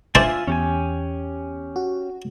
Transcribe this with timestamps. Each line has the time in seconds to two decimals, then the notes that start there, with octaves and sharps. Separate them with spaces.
0.15 D4 F4 C5 E5 G#5 A5
0.48 E2 C#4 G4 G#5
1.76 F#4